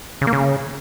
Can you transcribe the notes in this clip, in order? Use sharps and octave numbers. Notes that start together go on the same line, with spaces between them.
C#3
A#3
C#3